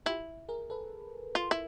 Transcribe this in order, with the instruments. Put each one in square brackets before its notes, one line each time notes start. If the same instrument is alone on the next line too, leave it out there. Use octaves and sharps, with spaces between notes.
[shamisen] E4 [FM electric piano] F4 G4
[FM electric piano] G#4 A#4
A4 B4
[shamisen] F4
E4